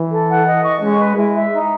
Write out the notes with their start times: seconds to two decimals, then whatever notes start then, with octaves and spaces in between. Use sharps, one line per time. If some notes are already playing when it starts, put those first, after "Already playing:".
Already playing: E3
0.10 A4
0.28 F#5
0.46 D#5
0.63 C#6
0.80 G#3 C#4
0.99 B4
1.16 G#3 E4
1.34 E5
1.52 D#4